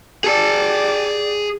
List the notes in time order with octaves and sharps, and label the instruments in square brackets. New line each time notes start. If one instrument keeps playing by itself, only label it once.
[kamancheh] G4 D5 [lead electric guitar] G#4 A5